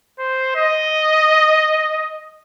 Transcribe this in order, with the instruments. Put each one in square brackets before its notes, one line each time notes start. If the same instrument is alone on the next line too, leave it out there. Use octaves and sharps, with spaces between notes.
[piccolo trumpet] C5
D#5